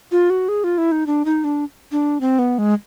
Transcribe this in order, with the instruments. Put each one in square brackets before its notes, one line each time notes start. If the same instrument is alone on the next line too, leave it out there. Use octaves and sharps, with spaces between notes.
[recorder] F4
F#4
G#4
F4
E4
D#4
D4
D#4
D4
D4
C4
B3
G#3